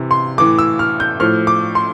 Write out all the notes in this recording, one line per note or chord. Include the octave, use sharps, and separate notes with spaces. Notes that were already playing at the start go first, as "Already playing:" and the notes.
Already playing: C3 E3
C6
A2 E3 D6
E6
F6
G6
A2 F3 F6
D6
C6